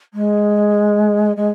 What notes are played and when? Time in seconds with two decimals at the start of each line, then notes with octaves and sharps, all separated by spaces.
0.13 G#3
1.36 G#3